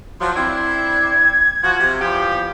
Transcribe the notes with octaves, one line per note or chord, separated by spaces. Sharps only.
F3 F#3 C6
C4 D4 E4 G#6
F3 F#4
C3
E2 F3 G4